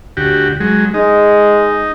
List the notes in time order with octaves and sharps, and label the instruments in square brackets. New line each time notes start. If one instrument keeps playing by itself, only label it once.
[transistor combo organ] D2 F#4 G4
F#3 G#3
[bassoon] G#3 [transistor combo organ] D#4